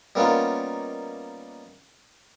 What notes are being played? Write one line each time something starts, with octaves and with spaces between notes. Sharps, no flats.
G3 A#3 B3 C#4 D#4 F4